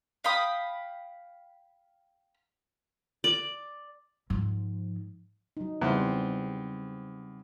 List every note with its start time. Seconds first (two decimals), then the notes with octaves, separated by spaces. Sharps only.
0.24 F5 G5 B5 D#6
3.24 D5
4.30 G#2 F3
5.57 F#3 D#4
5.82 E2 C#3 G3 C4 C5